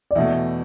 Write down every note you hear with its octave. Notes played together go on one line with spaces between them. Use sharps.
D5
E2 B2 A3 E5